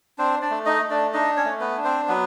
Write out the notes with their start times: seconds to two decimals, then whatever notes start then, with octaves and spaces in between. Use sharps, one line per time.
0.18 C4 D4 C5
0.42 D4 D5
0.50 A3
0.66 D#4 D#5
0.82 A3
0.90 D4 D5
1.13 D4 D#4 D#5
1.37 C#4 C#5
1.45 A3
1.60 B3 B4
1.77 D4
1.84 C4 C5
2.08 F#3 B3 B4